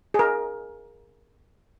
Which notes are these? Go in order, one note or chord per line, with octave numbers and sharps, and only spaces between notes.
G#4
A#4